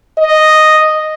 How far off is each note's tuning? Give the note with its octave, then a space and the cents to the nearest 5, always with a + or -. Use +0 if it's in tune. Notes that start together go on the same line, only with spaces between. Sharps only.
D#5 -5